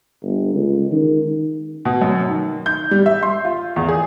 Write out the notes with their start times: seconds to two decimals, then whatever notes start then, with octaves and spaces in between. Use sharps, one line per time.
0.22 G1
0.54 C#2
0.91 D#3
1.85 B2
2.02 F#2
2.28 D#3
2.66 G6
2.91 G3
3.06 E5
3.23 C6
3.45 F4
3.76 E2
3.89 G#4